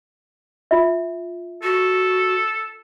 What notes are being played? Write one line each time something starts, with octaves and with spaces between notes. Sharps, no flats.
F4 E5
F#4 A4